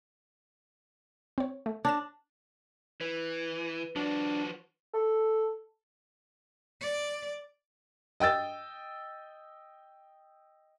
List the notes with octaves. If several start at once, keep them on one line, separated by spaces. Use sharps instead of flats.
C4 C#5
A3
D4 C#5 A#6 E7
E3 B4
F3 D4 F#4
A4
D5
D#5 G5 E6 A6